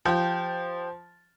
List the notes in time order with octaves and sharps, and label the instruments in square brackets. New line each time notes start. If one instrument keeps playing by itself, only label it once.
[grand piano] F3 [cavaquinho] G4 G5